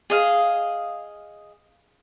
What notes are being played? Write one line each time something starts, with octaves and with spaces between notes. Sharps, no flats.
G#4 D#5 F5